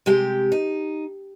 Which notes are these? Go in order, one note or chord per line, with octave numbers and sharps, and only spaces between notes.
C3 G#3 G4 G5
D#4